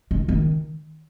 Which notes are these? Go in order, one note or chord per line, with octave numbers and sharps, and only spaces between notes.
D#3
D#3